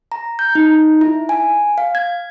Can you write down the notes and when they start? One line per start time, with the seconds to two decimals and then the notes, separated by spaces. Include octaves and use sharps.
0.12 A#5
0.39 G6
0.55 D#4
1.01 E4
1.29 G#5
1.78 F5
1.95 G#6